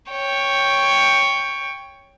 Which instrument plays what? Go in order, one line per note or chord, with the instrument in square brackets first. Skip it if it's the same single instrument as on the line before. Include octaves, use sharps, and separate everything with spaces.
[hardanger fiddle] C#5 G5